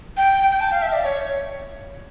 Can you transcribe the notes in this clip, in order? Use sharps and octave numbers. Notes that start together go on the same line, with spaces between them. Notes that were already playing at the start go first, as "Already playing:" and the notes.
G5
G5
A5
F5
E5
D5
C#5